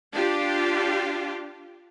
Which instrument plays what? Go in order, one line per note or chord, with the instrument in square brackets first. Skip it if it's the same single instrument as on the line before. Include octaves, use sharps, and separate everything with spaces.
[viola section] D4 F4 G4